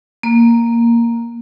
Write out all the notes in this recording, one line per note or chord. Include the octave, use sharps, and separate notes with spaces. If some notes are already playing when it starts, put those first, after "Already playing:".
A#3